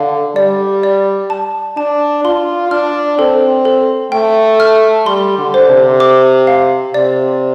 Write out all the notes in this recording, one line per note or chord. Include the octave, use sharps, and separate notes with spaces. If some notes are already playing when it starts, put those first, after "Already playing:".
Already playing: D3 F5
G3 D5
D5
A5
D4 A5
F4 C6
D4 F6
C4 A4
A4
A3 G5
F6
G3 C6
D3
C5
C3
D6
F5
C3 D5